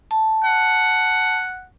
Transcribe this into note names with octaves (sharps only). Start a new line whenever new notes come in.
A5
F#5